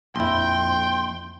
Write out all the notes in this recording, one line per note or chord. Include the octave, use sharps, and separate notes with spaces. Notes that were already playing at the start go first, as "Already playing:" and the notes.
A#1 F2 E4 G5 C6